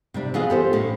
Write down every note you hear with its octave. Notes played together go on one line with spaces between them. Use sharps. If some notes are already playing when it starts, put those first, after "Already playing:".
C3 G3 D4
E3 B3 F4 F#4 G#4 D#5
G4 A4 C5
A2 C#4